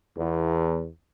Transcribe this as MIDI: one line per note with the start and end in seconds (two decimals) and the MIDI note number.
0.17 0.85 40